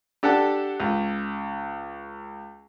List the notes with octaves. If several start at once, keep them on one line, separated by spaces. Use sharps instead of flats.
D4 G4 A4 F#5 A5
C#2